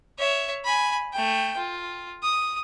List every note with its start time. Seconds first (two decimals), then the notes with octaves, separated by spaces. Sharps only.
0.19 C#5 E5
0.64 G#5 B5
1.13 A3 G5
1.57 F4
2.23 D#6